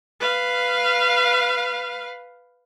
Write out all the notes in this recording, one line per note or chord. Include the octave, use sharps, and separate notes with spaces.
B4 F5